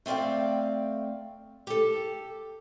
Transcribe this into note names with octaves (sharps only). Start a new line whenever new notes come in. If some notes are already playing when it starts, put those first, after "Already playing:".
A3 C4 D5 F5 G5
G4 A4